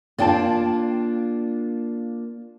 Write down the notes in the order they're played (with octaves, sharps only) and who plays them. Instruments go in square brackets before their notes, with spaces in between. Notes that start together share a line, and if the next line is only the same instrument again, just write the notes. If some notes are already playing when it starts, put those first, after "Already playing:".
[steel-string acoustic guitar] A#3 D4 F4 [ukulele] D5 G5 A5